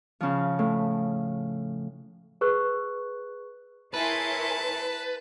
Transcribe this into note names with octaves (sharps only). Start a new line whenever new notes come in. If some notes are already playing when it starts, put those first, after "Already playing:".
C#3 F3
A2
G#4 B4 C#6 F#6
E4 G#4 A#4 B4 C#5 G#5 A5 C6